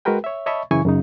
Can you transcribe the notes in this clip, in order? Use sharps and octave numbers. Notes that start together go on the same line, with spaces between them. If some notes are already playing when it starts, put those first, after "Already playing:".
G#3 F#4 G#4 A#4 B4 G5
C#5 E5
C#5 D#5 E5 A5 B5 C#6
F#2 C#3 E3 E4 G#5 C#6
F#2 C#3 D#4